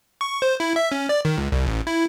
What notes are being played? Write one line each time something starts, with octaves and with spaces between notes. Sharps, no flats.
C#6
C5
E4
E5
C#4
D5
D#3
C#2
C2
A1
E4